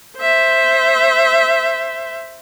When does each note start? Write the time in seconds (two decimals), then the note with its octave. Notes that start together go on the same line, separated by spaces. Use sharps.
0.18 C5 E5